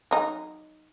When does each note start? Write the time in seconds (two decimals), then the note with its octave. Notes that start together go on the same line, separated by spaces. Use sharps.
0.11 F#3 D#4